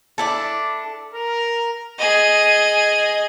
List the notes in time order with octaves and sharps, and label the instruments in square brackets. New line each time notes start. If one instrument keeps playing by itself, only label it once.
[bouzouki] D4 E4 A4
[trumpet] A#4
[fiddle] G#4 D#5